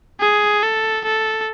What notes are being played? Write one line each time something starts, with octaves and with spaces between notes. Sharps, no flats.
G#4
A4
A4